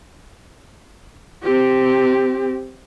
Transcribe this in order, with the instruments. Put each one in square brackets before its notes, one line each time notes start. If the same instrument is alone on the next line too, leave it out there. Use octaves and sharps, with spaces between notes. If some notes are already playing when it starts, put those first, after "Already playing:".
[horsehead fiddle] C4 G4